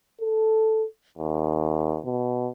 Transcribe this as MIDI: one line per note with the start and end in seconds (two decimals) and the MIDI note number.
0.21 0.85 69
1.18 2.00 39
2.05 2.49 47